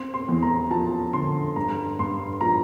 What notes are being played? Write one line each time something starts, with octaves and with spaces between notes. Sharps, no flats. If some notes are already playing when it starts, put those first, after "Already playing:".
Already playing: C4 C6
C6
E2
A#5
F3 A5
D3 C6
G2 A#5
G2 C6
F3 A#5